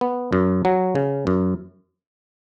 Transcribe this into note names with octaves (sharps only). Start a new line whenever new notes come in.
B3
F#2
F#3
C#3
F#2